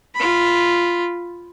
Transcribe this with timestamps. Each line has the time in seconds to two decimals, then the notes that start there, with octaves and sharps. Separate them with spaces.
0.16 F4 B5